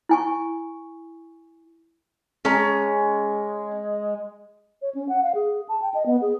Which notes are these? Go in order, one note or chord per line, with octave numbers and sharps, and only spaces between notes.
E4 G#5 C#6
G#3 C#4 A#5
C#5
C#4
F#5
F5
G#4
A5
G5
D#5
B3
G#4